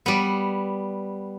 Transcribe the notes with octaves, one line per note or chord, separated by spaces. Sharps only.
G3 B3